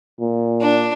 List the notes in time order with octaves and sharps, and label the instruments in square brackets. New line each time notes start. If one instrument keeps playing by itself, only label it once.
[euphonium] A#2
[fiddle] D4